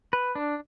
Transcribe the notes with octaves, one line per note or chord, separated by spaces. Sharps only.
B4
D4